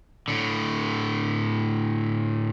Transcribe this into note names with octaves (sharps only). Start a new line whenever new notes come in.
A2 D3